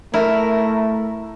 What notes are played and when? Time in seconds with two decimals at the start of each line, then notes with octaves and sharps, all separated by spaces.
0.14 A3 E4 A#4